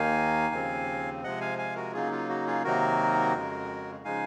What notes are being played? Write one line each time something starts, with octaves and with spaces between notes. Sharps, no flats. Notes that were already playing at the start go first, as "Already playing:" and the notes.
Already playing: D#2 D#3 A#3 D#4 F5 G#5
D#2 C#3 F3 C4
C3 F3 G#3 D#5 F#5
F5 G#5
F5 G#5
F#4 A#4
C#3 F#3 A#3 D#4 F4 G#4
F4
F#4
F4 G#4
C3 D#3 F#3 A#3 D#4 F#4 A#4
F2 C#3 G#3
C#3 F3 G#3 D#4 F5 G#5